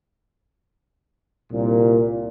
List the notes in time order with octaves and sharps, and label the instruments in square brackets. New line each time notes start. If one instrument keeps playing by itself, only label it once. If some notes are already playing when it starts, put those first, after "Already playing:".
[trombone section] C2 A#2